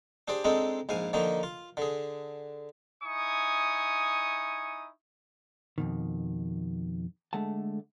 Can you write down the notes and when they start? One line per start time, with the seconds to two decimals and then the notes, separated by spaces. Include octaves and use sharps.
0.28 D4 G4 G#4 C5 D5
0.44 G#3 C4 D4 D#4 G#4 A4
0.89 A#1 G#2 F5 G#5
1.13 D3 D#3 F3 A#3 D#4
1.43 F4
1.77 D3 G#4
3.04 D#4 E4 G#5 C#6 D#6
5.78 F2 B2 D#3
7.33 D3 G#3 A3 F#5 A5